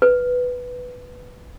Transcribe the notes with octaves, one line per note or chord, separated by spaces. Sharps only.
B4